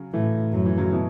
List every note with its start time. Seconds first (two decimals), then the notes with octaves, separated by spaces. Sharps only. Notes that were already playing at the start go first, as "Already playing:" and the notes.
Already playing: C#3 F#3
0.13 A2 E3 A3
0.53 F#2 F#3
0.65 E3
0.77 C#3 F#3
0.93 B2 E3